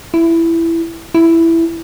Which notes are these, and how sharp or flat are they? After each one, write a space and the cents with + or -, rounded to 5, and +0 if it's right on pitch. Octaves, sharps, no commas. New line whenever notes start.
E4 +10
E4 +5